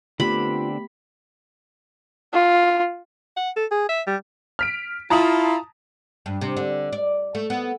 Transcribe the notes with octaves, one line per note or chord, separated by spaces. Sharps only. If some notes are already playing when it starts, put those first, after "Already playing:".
D3 A3 B3 C4 D4 F4 G4 B5
F4
F#5
A4
G#4
E5
G3
F6 B6 D7
E4 F4 A5 A#5 D#6
G2
C3
D3
D5
A3
B3